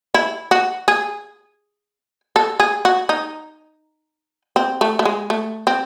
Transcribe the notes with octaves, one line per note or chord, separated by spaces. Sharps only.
E4
F#4
G#4
A4
G#4
F#4
D#4
C4
A3
A3
G#3
A3
C4